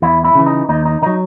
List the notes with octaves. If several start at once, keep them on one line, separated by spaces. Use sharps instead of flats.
E2 E4
E4
C#3 E3
D#4
D#2 D#4
D#4
D#3 F#3 D#4